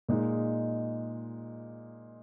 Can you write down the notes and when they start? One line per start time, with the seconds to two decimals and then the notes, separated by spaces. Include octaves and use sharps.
0.09 A#2 G#3 D#4